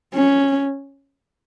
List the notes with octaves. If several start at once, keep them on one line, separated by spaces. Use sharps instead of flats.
C#4